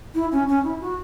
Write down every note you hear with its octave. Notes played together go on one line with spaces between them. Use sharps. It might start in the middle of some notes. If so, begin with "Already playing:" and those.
E4
C#4
C#4
E4
F#4